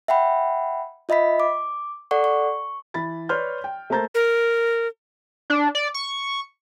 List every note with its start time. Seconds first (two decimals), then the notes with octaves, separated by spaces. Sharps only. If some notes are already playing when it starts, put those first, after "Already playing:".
0.08 E5 F#5 G5 B5
1.09 F4 D#5 E5 B5 B6
1.40 D6
2.11 A4 D5 F#5 C#6
2.24 C#6
2.94 E3 B5 A6
3.29 B4 C#5 D5 C6 F6 G6
3.64 G5
3.90 A3 A#3 C5 A#5 G6 A6
4.14 A#4
5.50 D4
5.75 D5
5.94 C#6